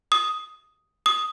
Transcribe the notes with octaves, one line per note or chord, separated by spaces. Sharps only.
D#6
D#6